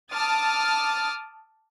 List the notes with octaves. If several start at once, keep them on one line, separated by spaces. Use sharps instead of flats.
A5 D6 D#6 F6 A6